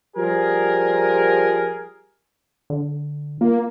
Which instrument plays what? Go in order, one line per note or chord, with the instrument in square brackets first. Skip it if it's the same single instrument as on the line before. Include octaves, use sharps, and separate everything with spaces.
[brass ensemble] F3 G3 G4 G#4 A#4
[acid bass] D3
[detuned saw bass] A#3 [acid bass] F4